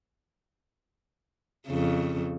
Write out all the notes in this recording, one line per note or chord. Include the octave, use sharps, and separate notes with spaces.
F2 C#3